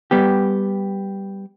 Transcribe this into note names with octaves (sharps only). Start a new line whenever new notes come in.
G3 B3 G4